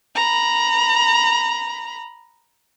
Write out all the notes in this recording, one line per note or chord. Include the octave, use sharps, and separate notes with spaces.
A#5 B5